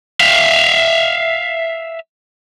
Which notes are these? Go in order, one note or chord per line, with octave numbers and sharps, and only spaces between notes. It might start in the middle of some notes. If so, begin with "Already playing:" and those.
E5 F5